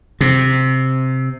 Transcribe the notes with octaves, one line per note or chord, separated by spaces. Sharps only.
C3